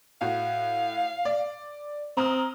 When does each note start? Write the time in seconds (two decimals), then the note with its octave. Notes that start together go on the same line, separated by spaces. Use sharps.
0.21 A2 F#4 F5
1.25 D5
2.17 C4 A#5 D#6 F6